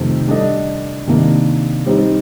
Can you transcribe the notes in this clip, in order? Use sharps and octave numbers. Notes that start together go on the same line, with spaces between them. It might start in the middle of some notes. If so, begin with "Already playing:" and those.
Already playing: F2 C3 D#3 A3 C4
G3 D4 A4 D#5
C3 D#3 A#3 D4
G3 C4 D#4 G4